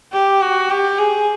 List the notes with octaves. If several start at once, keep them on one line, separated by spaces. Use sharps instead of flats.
G4
F#4
G4
G#4